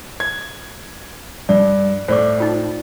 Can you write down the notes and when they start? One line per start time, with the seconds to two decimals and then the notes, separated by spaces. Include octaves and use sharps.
0.20 G#6
1.49 G2 D5
2.08 A2 C5 D5 D6
2.38 D#4 F4 G5